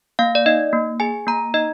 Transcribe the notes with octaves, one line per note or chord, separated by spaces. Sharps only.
A#3 F5
D5
D#4 D#5
A#3
G#4 G#5
A#3 A#5
D#4 D#5